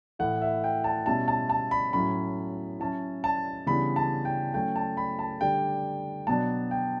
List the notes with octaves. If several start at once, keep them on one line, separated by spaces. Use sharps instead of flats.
A2 E3 A3 E4 F#5
E5
G5
A5
B2 G3 C#4 E4 A5
A5
A5
B5
A2 F#3 C#4 E4 B5
F#3 C#4 E4 A5
A5
C#3 E3 G3 B3 D4 B5
A5
G5
F#3 A3 C#4 E4 G5
A5
B5
A5
D3 G3 D4 G5
B2 F#3 B3 D4 A5
G5